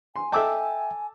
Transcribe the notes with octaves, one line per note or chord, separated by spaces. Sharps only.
G#5 C6
A4 D#5 E5 G5 A5 D6 E6